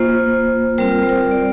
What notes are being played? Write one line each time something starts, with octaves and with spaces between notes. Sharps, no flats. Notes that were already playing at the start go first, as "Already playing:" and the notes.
Already playing: A#3 F4 C5
G3 C4 F4 A#4
C5
A#4
D5